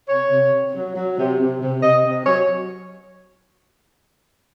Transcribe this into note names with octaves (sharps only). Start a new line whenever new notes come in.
C3 C#5
C3
C3
F#3
F#3
C3
C3
C3
C3 D#5
C3
F#3 C#5